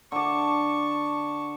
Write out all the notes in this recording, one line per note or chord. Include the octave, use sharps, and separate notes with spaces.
D3 A5 C#6 D6